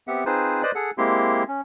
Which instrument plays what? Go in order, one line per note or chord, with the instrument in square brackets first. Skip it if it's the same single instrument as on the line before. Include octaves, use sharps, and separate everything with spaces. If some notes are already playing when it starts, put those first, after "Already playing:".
[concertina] B3 C4 G4 E5 F#5
C4 D#4 F4 G#4 B4 C5
B4 C5 D5 D#5 B5
G#4 A4 F#5
G#3 A#3 C4 E4 G4 C6
C#4